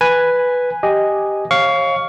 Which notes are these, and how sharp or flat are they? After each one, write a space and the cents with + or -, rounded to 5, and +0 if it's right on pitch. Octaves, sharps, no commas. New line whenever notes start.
B4 +0 G#5 -5
G4 +0 D#5 +0 G#5 +0
C#5 -35 F5 +0 C#6 +25